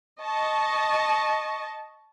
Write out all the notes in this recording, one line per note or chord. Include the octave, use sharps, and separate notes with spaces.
D#5 A5 C#6